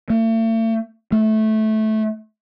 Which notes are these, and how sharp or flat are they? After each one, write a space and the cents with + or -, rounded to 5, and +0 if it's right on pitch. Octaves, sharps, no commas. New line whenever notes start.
A3 +40
A3 -15